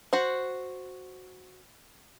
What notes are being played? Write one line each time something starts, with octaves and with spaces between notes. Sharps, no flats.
F#4 C5 F#5